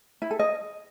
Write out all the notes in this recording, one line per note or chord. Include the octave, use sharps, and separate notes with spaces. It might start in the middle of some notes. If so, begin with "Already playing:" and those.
E4
A4
D#5